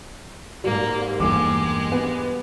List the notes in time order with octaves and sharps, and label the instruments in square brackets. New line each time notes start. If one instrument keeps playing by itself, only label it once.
[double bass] G#2 [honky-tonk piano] G3 [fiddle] A#3
[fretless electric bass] E2 G2 A#3 [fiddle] G#3 G4 [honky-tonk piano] D6
[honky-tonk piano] B3